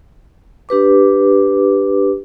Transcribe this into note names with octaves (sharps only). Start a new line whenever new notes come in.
D4 G4 B4 D6